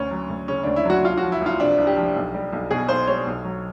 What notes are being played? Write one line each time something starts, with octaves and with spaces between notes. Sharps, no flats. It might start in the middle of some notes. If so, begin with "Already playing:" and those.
Already playing: D2 C#4
F#3
D2
C#3 C#4
D2 D4
E4
F#3 F#4
C2 F4
F3 F#4
E4
C2 F4
C3 D4
C2
G4
F3
B1
G3
B1
B2 G#4
B1 C5
G3 C#5
B1
F#3